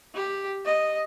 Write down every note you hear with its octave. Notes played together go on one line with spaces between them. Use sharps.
G4
D#5